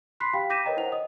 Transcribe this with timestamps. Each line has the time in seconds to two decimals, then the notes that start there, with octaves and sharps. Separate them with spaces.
0.20 B5 C6 F#6 B6 C7
0.33 G4 F5 G5 B5 B6
0.50 D6 G6 A#6 B6 D#7 E7
0.65 A#4 B4 C#5 D#5 G5 A#5
0.77 E4 C5 F#5 F7
0.92 D#5 D#6